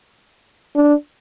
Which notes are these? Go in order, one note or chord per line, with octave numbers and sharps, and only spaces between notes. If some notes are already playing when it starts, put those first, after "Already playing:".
D4